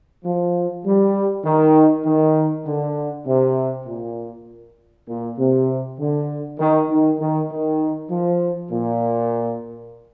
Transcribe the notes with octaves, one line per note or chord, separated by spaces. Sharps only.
F3
G3
D#3
D#3
D3
C3
A#2
A#2
C3
D3
D#3
D#3
D#3
D#3
F3
A#2